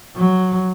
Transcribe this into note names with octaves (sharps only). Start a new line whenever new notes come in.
F#3